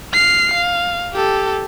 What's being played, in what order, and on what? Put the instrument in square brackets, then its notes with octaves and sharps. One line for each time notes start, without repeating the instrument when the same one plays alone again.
[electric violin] F6 C7
F5
G4 A4